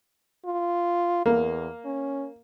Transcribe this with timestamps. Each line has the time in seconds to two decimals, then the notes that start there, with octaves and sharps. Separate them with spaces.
0.45 F4
1.26 E2 A#3
1.85 C#4